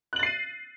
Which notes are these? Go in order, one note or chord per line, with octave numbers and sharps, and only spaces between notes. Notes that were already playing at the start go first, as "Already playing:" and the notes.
F#6 A6 C7 D#7 F#7